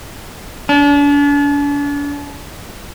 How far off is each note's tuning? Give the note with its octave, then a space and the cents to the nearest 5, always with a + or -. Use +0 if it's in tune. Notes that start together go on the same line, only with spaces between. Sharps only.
D4 -40